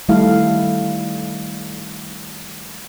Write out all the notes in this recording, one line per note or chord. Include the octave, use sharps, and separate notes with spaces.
D#3 G3 A3 E4 A4 F5